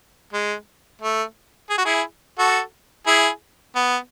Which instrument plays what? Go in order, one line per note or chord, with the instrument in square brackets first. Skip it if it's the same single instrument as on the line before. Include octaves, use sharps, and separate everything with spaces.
[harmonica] G#3
A3
G#4
F#4
E4 G#4
F#4 A4
E4 G#4
B3